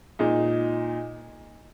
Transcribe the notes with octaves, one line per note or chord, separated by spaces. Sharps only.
A#2 G#3 D#4